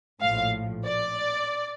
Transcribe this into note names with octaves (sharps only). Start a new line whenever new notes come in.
A#1 A2 F3 F5
D5